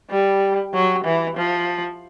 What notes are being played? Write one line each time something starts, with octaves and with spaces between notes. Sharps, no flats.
G3
F#3
E3
F3